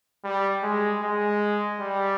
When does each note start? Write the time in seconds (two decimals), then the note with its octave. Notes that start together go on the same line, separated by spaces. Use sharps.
0.24 G3
0.63 G#3
1.02 G#3
1.80 G3